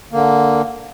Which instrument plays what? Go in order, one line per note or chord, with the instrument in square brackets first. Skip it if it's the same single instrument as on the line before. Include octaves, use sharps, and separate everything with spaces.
[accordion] D3 A#3